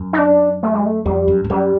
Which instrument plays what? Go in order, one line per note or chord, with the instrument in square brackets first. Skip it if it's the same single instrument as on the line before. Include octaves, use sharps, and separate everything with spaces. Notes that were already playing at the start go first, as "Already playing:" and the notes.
Already playing: [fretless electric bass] F#2
[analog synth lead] D#4
D4
A3
G#3
A3
[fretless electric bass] F2 [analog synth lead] G3
[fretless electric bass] F#2
G2
[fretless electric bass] F#2 [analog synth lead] G3